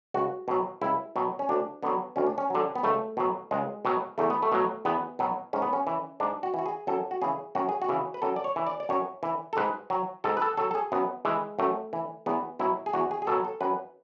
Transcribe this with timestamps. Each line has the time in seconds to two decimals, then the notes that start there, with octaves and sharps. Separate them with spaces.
0.14 C#2 F#4
0.48 B2 F#3
0.82 C#2 E4
1.16 B2 F#3
1.39 C#4
1.49 D2 D4
1.83 D3 F#3 B3
2.16 D2 C#4
2.27 D4
2.38 C#4
2.50 D3 F#3
2.75 B3
2.83 C#2 A3
3.17 B2 F#3
3.51 C#2 G#3
3.85 B2 F#3
4.18 E2 A3
4.30 B3
4.42 A3
4.52 B2 F#3
4.85 E2 B3
5.19 B2 F#3
5.53 G#2 C#4
5.62 B3
5.73 C#4
5.87 E3
6.20 G#2 D4
6.43 F#4
6.54 E3 F#4
6.66 G#4
6.87 F#2 A4
7.11 F#4
7.22 C#3 E3 G#4
7.55 F#2 F#4
7.69 G#4
7.82 F#4
7.89 C#3 E3
8.14 B4
8.22 F#2 A4
8.36 D5
8.44 C#5
8.56 E3
8.67 D5
8.80 D5
8.89 F#2 C#5
9.23 E3
9.53 A4
9.57 G#2 B4
9.90 F#3
10.24 G#2 A4
10.37 B4
10.42 A4
10.57 F#3 A4
10.71 A4
10.75 G#4
10.92 F#2 B3
11.25 E3 G#3
11.59 F#2 A3
11.93 E3
12.26 E2 B3
12.59 B2 F#3 E4
12.86 G#4
12.93 E2 F#4
13.11 G#4
13.22 G#4
13.27 B2 F#3 A4
13.45 A4
13.61 F#2 B4